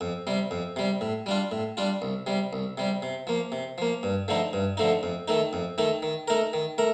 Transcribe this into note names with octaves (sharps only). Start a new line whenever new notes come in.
F2
C3 G3
F2
C3 G3
A2
G3 D4 F4
A2
G3 D4 F4
C2
C3 G3
C2
C3 G3
C3
F3 A#3
C3
F3 A#3
G2
D3 F3 A3 D#4
G2
D3 F3 A3 D#4
F2
D#3 A3 D#4
F2
D#3 A3 D#4
D#3
A3 D#4 A#4
D#3
A3 A#4